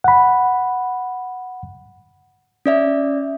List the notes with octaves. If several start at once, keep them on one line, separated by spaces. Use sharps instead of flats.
F#5 B5
C#4 D5 E5